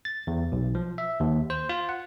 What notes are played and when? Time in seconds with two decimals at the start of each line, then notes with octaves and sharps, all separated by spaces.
0.05 A6
0.27 E2
0.52 B1
0.75 F3
0.98 E5
1.20 D#2
1.50 C5
1.69 F4
1.89 F#5